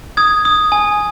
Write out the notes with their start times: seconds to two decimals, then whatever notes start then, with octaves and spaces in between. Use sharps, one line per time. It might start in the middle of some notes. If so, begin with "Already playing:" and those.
0.17 D#6 G#6
0.45 D#6
0.72 G#5